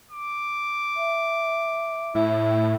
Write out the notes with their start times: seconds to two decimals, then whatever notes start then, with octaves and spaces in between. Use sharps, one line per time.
0.11 D6
0.97 E5
2.15 A2 E4